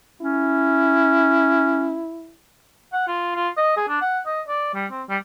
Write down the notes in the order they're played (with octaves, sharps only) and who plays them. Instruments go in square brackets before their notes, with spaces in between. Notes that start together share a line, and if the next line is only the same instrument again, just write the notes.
[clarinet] C#4 [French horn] E4
[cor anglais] F#5
F4
F4
D#5
G#4
D4
F#5
D#5
D5
G3
C4
G3